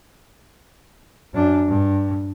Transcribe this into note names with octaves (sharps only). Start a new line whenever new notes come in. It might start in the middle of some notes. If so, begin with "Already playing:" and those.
F#2 D4
G2